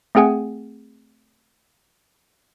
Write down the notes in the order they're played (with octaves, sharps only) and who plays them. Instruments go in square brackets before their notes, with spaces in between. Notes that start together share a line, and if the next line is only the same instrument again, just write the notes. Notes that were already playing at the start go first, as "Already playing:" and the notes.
[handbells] A3 C4 G#4 F#5 G#5